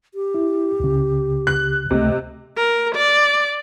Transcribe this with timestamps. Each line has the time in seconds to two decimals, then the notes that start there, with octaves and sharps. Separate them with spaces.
0.14 G4
0.34 E4
0.80 C#2 C#3
1.47 F#6
1.91 C#2 C3 A3 D#5
2.58 A#4
2.96 D5